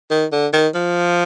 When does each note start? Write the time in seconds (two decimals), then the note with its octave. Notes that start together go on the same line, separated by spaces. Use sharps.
0.11 D#3
0.32 D3
0.53 D#3
0.75 F3